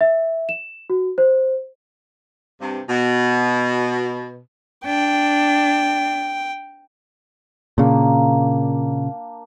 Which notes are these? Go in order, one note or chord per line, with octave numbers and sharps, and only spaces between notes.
E5
E7
F#4
C5
G2 C3
B2
D4 G5
A#2 C#3 A#3 D4